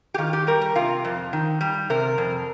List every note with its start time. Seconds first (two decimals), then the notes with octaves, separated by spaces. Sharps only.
0.14 G4
0.18 D#3 F4
0.33 G4
0.47 G3 A#4
0.61 A#4
0.76 C3 F4
1.05 F2
1.33 D#3
1.61 G3
1.90 C3 A#4
2.18 F2